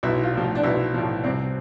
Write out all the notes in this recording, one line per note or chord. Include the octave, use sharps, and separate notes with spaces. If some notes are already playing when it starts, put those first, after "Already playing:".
B1 E4
F4
A2 F3
F4
D4
B1 E4
A2 F3
C2 C4